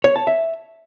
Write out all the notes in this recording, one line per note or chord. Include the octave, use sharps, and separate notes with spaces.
C#5
A5
E5